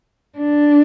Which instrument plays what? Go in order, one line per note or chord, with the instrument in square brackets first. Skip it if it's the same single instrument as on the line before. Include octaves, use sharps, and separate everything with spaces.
[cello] D4